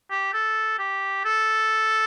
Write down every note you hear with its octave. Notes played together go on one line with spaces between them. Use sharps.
G4
A4
G4
A4